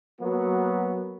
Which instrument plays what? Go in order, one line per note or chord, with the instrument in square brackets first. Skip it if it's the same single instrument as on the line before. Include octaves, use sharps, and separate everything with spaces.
[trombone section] F#3 A#3 B3 F#4